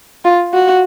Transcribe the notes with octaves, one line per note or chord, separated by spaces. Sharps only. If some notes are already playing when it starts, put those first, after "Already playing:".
F4
F#4